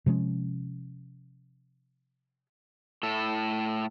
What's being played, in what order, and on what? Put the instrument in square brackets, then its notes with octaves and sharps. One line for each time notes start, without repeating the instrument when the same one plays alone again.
[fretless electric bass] C3 F3 G#3 C#4
[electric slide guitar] A2 A4